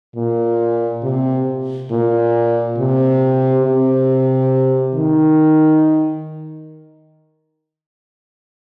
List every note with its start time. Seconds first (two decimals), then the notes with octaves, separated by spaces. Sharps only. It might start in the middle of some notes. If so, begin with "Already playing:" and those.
0.16 A#2
1.03 C3
1.91 A#2
2.78 C3
3.64 C3
4.95 D#3